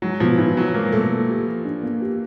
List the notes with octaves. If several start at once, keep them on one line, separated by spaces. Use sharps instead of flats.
F#3 G#3
B2 F3
B2 E3
F#3 C4
G#3 A#3
B2 A3
A#3
G4
F3
D4
A#3
G4